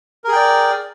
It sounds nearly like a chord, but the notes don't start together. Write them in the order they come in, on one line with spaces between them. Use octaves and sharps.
A#4 G#4 G5 D5